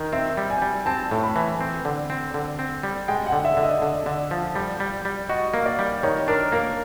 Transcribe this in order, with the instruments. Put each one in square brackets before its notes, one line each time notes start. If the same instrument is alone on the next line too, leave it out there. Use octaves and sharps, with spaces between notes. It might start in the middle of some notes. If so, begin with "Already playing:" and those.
Already playing: [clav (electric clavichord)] D#3
[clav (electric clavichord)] C4 [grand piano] E5
[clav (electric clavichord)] G3
[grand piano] G#5
[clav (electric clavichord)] G3
[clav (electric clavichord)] C4 [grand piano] A5
[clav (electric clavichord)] A2
[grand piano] B5
[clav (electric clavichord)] E3
C4
D3
C4
D3
C4
G3
[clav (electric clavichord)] G#3 [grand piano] G5
[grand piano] F#5
[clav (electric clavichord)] D3
[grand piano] E5
[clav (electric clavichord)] D3
[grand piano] D#5
[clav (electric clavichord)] D3
D3
F3
G3
G3
G3
[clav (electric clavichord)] F#4 [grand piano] D#5
[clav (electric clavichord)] A#3
[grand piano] D5
[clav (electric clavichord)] G3
[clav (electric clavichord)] D#3 [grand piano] C#5
[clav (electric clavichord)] D4 [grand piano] A#4
[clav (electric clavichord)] A#3 [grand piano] A#4